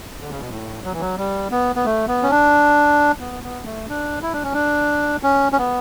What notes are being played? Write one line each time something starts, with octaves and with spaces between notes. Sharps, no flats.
D3
C#3
B2
A2
F#3
E3
F#3
G3
B3
B3
A3
B3
C#4
D4
B3
B3
A3
D4
E4
D4
C#4
D4
C#4
C#4
B3